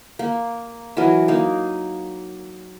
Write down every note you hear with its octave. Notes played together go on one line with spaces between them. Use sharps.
A#3
E3 F#3 A#4 D#5
A#3 D#4